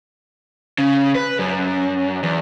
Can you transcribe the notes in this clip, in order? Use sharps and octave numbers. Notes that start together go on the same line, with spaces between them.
C#3
B4
F#2
E2